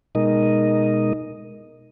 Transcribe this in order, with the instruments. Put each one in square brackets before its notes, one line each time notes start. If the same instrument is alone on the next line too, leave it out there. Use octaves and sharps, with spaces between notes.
[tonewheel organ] B2 G#3 D#4 A#4 D#5